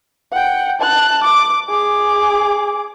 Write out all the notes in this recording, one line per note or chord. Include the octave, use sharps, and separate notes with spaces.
F#5 G5
A5 F#6
D6
G#4 D6